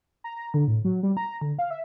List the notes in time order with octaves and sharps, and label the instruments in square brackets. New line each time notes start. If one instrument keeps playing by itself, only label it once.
[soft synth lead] A#5
A#5
D3
A2
F#3
G3
A#5
D3
F5
E5